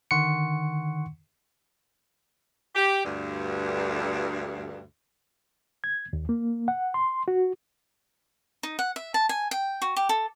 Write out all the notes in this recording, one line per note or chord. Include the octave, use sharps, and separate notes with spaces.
D3 D#3 F#5 C6 C#6 C#7
G4
D2 G2
G#6
D#2
A#3
F#5
C6
F#4
D#4
F#5
E5
A5
G#5
G5
F#4
G4
A4